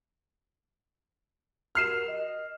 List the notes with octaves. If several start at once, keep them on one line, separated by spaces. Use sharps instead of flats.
F#4 G4 A#4 F6 C7 E7
D#5